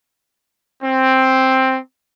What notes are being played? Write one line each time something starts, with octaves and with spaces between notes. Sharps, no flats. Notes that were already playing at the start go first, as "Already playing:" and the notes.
C4